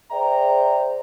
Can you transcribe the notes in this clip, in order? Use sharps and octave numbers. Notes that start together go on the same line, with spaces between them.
G#4 C5 D5 E5 G5 A#5